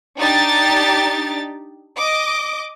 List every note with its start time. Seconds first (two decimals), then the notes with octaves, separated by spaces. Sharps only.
0.18 D4 D#4 G4 A6
1.97 D#5 D6